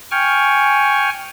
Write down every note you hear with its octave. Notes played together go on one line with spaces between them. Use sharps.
G5 G#5 C#6 F6